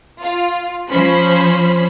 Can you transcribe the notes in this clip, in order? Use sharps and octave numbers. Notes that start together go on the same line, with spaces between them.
F4
F3 C#4 C5 B5